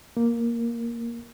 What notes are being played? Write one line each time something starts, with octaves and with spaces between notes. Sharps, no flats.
A#3